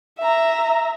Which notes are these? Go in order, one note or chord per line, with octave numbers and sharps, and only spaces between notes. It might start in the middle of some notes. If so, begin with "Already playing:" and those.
E5 A#5